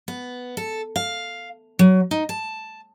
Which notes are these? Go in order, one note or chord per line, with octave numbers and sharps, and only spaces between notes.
B3
A4
F5
F#3
D#4
A5